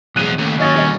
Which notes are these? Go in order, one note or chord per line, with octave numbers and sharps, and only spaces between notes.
B1 E2 F3 G#3 F#6 D#7 F7
D#2 C#3 A3 C#4
F#3 C#4 D#5 A6 A#6
B2 G3 F#4 C#5 D#5